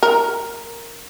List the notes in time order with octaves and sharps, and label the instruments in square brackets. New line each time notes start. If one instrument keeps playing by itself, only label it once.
[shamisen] A#4